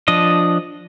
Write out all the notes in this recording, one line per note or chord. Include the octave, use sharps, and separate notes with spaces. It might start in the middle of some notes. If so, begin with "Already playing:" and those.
F3 D4 D#5